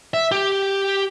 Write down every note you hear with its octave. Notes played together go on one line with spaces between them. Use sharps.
E5
G4